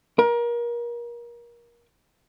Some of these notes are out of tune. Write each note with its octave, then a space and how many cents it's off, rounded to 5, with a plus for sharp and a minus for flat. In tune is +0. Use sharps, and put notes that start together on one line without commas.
A#4 +30